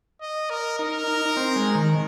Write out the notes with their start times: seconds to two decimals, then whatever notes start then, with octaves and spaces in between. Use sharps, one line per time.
0.21 D#5
0.50 A#4
0.79 D#4 A#4
1.08 D#4
1.26 D#4
1.37 C4
1.56 G#3
1.75 D#3